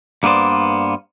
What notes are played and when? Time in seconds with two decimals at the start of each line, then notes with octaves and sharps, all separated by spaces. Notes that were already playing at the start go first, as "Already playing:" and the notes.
0.23 G2 A#3 B3 D4 C5 D5